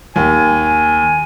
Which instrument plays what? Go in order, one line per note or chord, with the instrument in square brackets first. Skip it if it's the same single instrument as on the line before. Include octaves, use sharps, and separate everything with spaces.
[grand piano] D#2 [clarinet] G#5